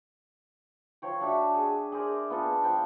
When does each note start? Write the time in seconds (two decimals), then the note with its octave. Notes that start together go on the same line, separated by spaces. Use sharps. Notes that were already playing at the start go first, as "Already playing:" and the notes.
1.02 F3 C#5 G5
1.21 F#3 D4 A4 E5
1.55 G#4
1.92 G#4 A#4 C5 D5
2.30 B3 F4 A4 A5
2.64 F3 G5